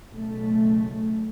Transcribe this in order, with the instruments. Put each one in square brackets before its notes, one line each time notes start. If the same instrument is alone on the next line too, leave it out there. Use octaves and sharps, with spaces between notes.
[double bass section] B1 C#3 A3